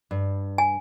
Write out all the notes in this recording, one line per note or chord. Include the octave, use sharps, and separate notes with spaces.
G2
G#5